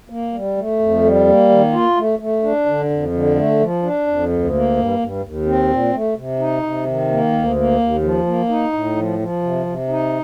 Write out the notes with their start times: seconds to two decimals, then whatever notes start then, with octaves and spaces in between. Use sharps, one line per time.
0.10 A#3
0.33 G3
0.57 A3
0.79 F2
1.04 G3
1.27 A#3
1.49 D#3
1.73 F4
1.97 A3
2.19 A3
2.43 D4
2.66 D3
2.90 F2
3.13 D3
3.36 A3
3.60 F3
3.83 D4
4.07 F2
4.30 D2
4.53 A#3
4.76 G2
4.99 G2
5.23 D#2
5.46 C4
5.70 A#2
5.93 A3
6.16 C3
6.39 D#4
6.63 C3
6.86 D#3
7.09 A#3
7.33 D2
7.56 A#3
7.79 D#2
8.03 F3
8.26 A#3
8.49 D#4
8.73 A2
8.96 F3
9.19 F3
9.42 C3
9.66 C3
9.89 D#4